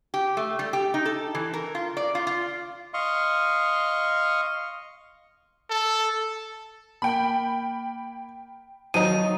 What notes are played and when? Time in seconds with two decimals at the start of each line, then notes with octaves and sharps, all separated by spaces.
0.14 G4
0.37 A3
0.59 G3
0.73 G4
0.94 D#4
1.05 A4
1.35 E3
1.54 A#4
1.75 F4
1.97 D5
2.15 F4
2.27 F4
2.94 D#5 F5 C6 C#6
5.70 A4
7.02 A#3 G5 B5
8.94 D#3 F3 F#3 D#4 D#7